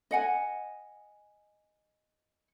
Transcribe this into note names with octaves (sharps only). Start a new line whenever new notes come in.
D#5 F#5 G#5